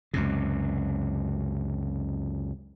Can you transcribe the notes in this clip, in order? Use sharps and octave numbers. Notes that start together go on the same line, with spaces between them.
C#2 F#2 C3